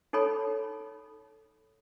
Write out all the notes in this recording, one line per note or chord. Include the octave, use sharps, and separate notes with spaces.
D#4 A4 C#5 B5